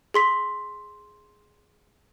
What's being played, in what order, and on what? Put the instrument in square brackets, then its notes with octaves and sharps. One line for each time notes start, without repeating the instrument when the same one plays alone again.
[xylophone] G#4 C6 B6